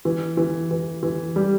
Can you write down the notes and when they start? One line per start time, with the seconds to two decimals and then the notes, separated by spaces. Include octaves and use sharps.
0.05 E3
0.37 E3
0.71 E3
1.03 E3
1.36 G3